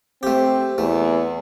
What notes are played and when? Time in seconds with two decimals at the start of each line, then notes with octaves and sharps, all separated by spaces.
0.23 A3 C4 G4
0.78 E2 A3